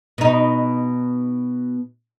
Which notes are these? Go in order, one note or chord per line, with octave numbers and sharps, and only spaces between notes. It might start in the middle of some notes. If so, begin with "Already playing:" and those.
B2 D#4